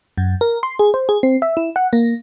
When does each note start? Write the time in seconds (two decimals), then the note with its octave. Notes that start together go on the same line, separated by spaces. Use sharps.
0.17 F#2
0.41 A#4
0.63 C6
0.79 G#4
0.94 C5
1.09 G#4
1.23 C4
1.42 E5
1.57 E4
1.76 F#5
1.93 A#3